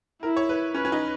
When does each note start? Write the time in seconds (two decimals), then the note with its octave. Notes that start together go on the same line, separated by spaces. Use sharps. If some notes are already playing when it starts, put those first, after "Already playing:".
0.23 E4 A#4
0.36 C#5
0.49 B4
0.74 C#4 B4
0.85 C#4
0.92 D#4